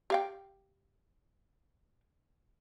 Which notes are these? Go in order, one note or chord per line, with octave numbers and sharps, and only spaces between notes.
G4 F5 G5